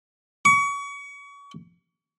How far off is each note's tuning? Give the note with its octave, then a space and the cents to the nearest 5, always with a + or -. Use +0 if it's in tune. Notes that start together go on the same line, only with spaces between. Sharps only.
C#6 +35